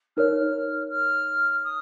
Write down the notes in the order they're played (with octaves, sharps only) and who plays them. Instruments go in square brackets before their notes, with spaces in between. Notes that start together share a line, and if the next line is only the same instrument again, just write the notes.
[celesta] D#4 A#4 C#5 [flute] F6
[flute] F6
D#6